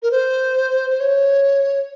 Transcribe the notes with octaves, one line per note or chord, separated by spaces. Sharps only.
A#4
C5
C5
C#5